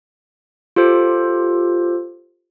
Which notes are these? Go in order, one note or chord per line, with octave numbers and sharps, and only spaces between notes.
F4 G4 A4 C5